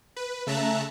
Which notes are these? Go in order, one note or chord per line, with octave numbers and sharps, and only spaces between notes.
B4
C#3 A3 E5 A5 A#5 F#6